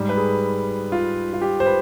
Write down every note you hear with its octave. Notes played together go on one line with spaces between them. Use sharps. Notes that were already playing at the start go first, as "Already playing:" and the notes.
Already playing: G#2 G3
B4
G#4
F4
F4
G4
C5
B4